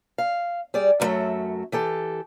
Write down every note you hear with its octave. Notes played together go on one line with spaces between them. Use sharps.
F5
G3 G#4 D5
F#2 C#3 F#3 A3 E5
E3 G4 A4